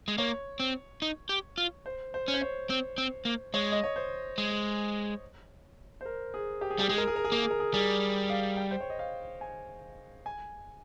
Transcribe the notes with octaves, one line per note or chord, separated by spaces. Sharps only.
G#3
A#3 C#5
C4
D#4
G4
F4
C5
C5
C#4
C5
C#5
C4
C4
A#3
G#3 C#5
D#5
C#5
C5
G#3
C5
A#4
G#4
G4
G#4
G3 G4
G#3 G#4
A#4
G#4
A#4
G#4
A#3 A#4
G#4
A#4
G#4
G3 G#4
F5
G5
C5
C#5
D#5
F5
G#5
G#5